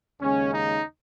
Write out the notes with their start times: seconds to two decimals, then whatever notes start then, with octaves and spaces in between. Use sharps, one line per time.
0.21 D#2 C#3 G#3 C#4
0.51 D#4